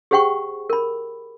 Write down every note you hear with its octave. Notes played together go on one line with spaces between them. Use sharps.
G4 G#4 C5 F#5 G5 C#6
A#4 B5